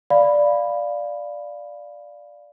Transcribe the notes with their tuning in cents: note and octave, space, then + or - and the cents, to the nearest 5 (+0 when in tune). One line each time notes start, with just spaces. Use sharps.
D5 +0 F5 +0 B5 +0